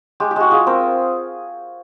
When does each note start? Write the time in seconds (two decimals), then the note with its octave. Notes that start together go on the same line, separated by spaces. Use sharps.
0.20 G#3 G4
0.31 G4
0.36 G#3 F#4
0.51 F4 G#4
0.66 C4 A#4